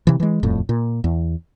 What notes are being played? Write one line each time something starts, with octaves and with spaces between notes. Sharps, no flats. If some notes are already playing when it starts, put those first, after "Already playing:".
C3 E3
E3 G#3
D#1 F2 A2
A#2
E2